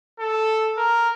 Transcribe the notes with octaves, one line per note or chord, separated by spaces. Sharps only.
A4
A#4